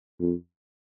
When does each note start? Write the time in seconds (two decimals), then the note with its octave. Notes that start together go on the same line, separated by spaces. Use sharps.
0.19 F2